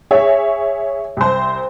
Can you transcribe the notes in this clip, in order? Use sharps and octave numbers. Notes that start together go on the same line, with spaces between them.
G#4 C#5 E5
C2 C5